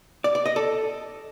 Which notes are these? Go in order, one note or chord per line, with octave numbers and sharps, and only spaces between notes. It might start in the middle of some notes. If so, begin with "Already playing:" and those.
D5
D5
D#5
A4